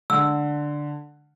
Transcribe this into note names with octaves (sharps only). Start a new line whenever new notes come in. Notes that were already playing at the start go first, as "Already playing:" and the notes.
D3 E6